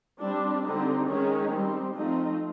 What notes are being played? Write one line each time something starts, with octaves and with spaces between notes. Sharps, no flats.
G3 C4 D4
D3 G3 C4 D#4
D#3 G#3 C#4 D#4
G3 C4
F3 A3 C4 D#4